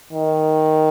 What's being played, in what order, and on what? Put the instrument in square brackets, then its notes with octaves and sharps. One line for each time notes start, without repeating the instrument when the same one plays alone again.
[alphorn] D#3